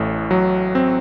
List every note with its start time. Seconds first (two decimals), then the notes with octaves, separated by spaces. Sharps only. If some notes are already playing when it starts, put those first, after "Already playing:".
Already playing: A1 A2
0.31 F#3
0.75 C4